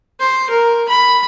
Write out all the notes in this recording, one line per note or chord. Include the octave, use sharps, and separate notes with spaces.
C5
A#4
B5